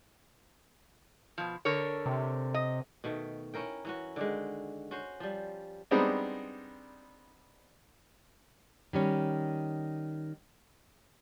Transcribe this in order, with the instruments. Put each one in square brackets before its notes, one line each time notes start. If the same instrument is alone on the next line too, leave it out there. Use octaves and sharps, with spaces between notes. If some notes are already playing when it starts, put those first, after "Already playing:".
[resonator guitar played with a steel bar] B2 F3
D3 A#4 C#5
[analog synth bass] C3
[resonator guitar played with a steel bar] D#5
[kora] B2 D#3 A3
C#4 E4 A#4 G5
E3 C#4 F#4
D3 D#3 G#3
C#4 F#4 C5
F3 G3
[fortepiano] G3 G#3 B3 C4 D4 D#4
[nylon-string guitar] D#3 G3 C#4